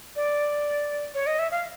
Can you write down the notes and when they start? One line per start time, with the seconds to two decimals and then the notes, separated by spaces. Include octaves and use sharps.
0.16 D5
1.15 C#5
1.27 D#5
1.39 E5
1.51 F5